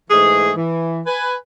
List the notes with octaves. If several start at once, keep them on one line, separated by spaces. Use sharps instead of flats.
G#2 E3 A3 G#4
E3
B4 G#5